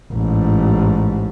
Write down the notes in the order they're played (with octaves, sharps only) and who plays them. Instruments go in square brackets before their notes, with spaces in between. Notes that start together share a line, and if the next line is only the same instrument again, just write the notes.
[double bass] A1 G#2